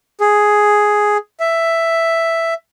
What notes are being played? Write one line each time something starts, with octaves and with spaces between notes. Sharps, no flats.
G#4
E5